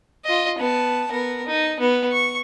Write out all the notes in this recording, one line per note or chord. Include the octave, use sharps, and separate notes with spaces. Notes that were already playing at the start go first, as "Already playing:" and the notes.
F4 D#5
B3 A5
B3 A#4
D#4
B3
C#6